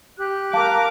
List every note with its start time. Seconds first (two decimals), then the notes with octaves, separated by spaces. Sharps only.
0.18 G4 F#6
0.53 A#4 F5 A5 D6